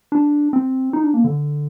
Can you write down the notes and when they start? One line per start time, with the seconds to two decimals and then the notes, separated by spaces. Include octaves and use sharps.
0.12 D4
0.53 C4
0.93 D#4
1.04 D4
1.14 A#3
1.24 D3